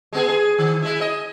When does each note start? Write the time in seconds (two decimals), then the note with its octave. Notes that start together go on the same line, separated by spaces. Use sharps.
0.13 G#3 B3 G#4
0.28 G#4
0.58 D#3
0.82 G#3 E4
1.01 D#5